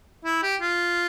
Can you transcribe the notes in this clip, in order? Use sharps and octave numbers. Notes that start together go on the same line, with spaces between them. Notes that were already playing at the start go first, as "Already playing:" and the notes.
E4
G4
F4